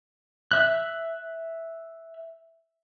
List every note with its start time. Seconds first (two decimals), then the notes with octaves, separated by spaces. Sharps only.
0.51 E5 F#6